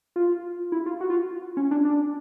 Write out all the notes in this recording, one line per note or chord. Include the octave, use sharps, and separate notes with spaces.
F4
E4
F4
F#4
F4
C#4
D4
D4